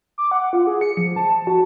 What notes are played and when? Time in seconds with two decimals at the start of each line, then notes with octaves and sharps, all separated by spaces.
0.18 D6
0.31 F#5
0.53 F4
0.67 G#4
0.81 C#7
0.97 F3
1.16 A5
1.47 F#4